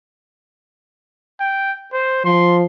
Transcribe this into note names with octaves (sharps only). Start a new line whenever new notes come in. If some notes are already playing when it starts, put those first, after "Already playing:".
G5
C5
F3 C6